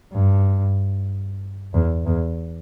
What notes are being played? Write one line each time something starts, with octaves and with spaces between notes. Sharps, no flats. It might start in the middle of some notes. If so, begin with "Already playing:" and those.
G2
E2
E2